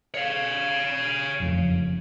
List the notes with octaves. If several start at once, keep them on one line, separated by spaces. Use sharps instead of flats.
C#5 F5
F#1 F2